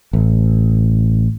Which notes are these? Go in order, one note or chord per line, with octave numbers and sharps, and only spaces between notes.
A1